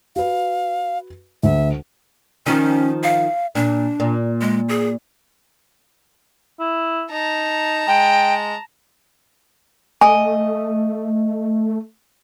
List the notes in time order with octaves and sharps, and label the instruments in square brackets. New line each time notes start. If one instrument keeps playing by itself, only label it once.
[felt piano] F#4 B4 [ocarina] F5
[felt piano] D2 [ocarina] E5
[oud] D#3 F3 [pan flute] C#4
[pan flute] F5
[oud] A#2 [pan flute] D4
[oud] A#2
[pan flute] G#3
G#4
[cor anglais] E4
[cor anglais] D#4 [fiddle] A5 A#5
[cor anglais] G#3 [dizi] G5
[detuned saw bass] A3 [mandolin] D#5 [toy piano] G#5